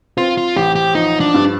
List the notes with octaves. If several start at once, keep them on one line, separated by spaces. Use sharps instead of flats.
C4 F4
F4
A1 G4
G4
F3 D#4
D4
G2